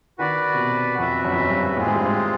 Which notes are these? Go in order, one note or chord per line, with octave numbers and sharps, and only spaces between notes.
D#3 F#4 B4 D5
C3
B2
F2 F#4 B4 E5
F#2
F2
F#2
G2
A2 G#3 C4 F4 G#4
G#2
G2
G#2